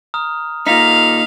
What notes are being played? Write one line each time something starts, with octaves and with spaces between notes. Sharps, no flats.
A#5 D#6 F6
A#2 D#4 F5 B6